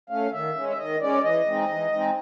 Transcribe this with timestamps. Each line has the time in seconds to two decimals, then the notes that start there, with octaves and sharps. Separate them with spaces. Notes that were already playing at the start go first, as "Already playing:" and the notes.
0.10 A3 C#4 F5
0.32 D#3 E5
0.55 G#3 C#4
0.69 E5
0.78 D#3 D#5
1.01 G#3 C#4 D5
1.24 E3 D#5
1.47 G#3 C4 D#4
1.69 E3
1.92 G#3 C4 D#4